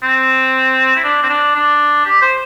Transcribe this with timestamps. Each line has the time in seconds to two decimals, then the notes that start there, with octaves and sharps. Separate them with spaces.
0.03 C4
0.96 E4
1.04 D4
1.23 C4
1.29 D4
1.55 D4
2.06 G4
2.22 C5